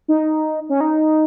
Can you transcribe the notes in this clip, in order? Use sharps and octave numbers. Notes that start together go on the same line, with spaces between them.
D#4
C#4
D#4